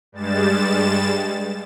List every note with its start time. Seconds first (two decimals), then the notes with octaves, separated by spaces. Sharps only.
0.12 G2 G3 G#3 A6 E7